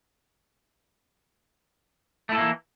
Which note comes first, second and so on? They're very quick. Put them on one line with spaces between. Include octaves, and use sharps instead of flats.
A3 E4 A4 A#3 E3